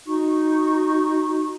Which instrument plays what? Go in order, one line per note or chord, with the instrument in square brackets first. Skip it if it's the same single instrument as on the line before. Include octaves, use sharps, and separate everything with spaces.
[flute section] D#4 F#4 C#6